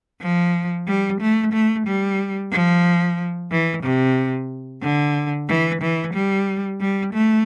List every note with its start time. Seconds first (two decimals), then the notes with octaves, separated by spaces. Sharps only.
0.21 F3
0.87 G3
1.21 A3
1.53 A3
1.86 G3
2.51 F3
3.51 E3
3.83 C3
4.82 D3
5.48 E3
5.81 E3
6.14 G3
6.80 G3
7.13 A3